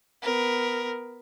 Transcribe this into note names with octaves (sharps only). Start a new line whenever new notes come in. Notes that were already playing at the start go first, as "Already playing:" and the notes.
B3 A#4